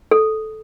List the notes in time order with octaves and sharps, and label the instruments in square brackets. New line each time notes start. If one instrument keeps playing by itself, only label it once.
[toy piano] A4